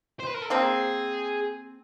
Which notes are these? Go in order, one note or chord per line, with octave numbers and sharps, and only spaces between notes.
C5
B4
A#4
A4
A#3 C4 G#4